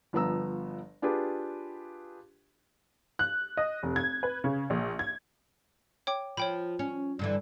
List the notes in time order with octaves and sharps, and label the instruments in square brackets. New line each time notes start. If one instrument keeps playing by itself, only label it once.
[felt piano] G1 F3 B3 A#5 E6
D4 F4 G4 G#4 B4
[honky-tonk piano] F#6
D#5
F1
G#6
B4
C#3
A#1
G#6
[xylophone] C#5 G5 D6
[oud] F3 [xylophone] C#5 G5 B5
[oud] C#4
G2 D3 E3